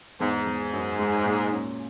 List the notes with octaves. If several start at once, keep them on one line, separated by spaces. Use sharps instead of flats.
E2 G#2
E2
F#2
G#3
A#2
C#4